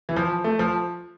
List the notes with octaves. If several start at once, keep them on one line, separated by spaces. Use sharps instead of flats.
E3
F3
A3
F3